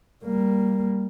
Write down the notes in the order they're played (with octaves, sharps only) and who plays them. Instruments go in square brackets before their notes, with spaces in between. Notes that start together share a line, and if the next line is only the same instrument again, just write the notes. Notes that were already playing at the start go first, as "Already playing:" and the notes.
[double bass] G3 A#3